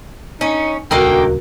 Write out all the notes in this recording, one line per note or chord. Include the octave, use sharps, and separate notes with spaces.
C#4 D#4
D#1 C#2 D3 D#3 A#3 F#4 A#4 G5